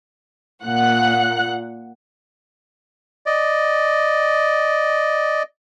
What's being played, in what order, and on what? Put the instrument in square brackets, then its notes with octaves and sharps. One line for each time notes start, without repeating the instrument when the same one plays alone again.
[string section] A#2 F#5 F#6
[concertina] D5 D#5